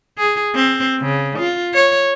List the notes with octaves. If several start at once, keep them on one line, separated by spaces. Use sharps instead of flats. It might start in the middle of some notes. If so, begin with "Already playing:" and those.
G#4
C4
C#3
F4
C#5